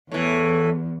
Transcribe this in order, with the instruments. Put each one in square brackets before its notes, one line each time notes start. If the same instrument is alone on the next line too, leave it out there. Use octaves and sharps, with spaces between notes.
[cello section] E2 [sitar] A2 E3